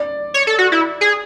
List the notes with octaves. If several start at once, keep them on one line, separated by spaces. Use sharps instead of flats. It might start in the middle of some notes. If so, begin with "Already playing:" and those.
Already playing: D5
C#5
A4
F#4
E4
G#4